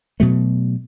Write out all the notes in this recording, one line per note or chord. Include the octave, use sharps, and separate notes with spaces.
B2 F#3 A3